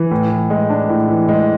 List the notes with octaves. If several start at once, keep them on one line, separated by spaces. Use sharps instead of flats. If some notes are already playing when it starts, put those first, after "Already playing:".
Already playing: E3
A2
E3
G#3
D4
A2
E3
G#3